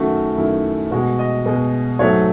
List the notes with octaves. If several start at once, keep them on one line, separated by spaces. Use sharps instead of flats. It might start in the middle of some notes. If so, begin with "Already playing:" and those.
Already playing: F#2 D#3 A3 F#4
F#2 D#3 A3 E4
B2 G#3 F#4
D#5
B2 G#3
G#2 F#3 A3 C#5